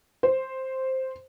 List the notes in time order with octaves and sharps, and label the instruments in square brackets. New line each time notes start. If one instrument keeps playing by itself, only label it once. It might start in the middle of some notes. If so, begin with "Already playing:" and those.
[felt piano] C5